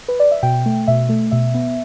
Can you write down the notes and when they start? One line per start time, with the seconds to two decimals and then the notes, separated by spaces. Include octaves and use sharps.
0.08 B4
0.20 D5
0.31 E5
0.43 B2 G5
0.66 A3
0.87 B2 E5
1.09 A3
1.31 B2 E5
1.54 B3